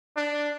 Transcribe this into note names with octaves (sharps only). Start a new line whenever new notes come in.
D4